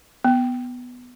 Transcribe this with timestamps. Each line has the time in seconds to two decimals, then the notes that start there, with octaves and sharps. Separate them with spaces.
0.24 B3